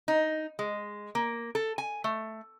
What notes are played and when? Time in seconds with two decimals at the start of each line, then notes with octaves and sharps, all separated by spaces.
0.08 D#4
0.59 G#3
1.15 A#3
1.55 A4
1.78 G#5
2.04 A3